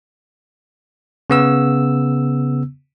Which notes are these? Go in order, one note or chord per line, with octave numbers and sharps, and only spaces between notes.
C#3 B3 E6